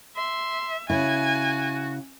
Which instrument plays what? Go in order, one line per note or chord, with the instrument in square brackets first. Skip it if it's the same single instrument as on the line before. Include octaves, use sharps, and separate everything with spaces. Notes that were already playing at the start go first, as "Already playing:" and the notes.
[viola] E5 [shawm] C6
[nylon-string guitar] C#3 E4 [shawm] F#4 [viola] G#5